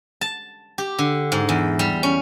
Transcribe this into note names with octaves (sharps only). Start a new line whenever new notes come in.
A5
G4
D3
G#2
E2
G3
C#4